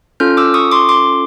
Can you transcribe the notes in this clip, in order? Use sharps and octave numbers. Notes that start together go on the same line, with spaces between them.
C#4 F4 A4 F6 G6
D6 E6
C#6 D#6
C6 D6
C6 D6